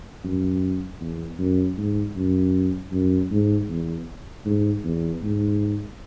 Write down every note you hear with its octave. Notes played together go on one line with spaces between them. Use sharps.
F#2
E2
F#2
G#2
F#2
F#2
G#2
E2
G#2
E2
G#2